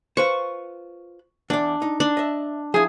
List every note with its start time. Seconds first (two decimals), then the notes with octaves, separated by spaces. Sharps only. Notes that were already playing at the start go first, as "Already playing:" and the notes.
0.17 F4 B4 C5 C#6
1.50 E2 D4 D5
1.82 D#4
2.00 D4
2.17 D#5 E5
2.74 F3 E4 G#4